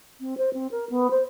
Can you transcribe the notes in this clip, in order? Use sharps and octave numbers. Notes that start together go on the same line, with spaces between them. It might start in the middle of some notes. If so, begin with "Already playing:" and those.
C4
C5
C4
A#4
B3
C5